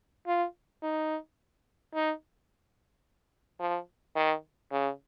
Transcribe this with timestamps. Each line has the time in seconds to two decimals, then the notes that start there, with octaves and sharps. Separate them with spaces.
0.27 F4
0.83 D#4
1.94 D#4
3.60 F3
4.16 D#3
4.72 C#3